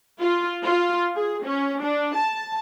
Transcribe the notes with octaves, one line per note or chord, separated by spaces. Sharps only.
F4
F4
G#4
C#4
D4
A5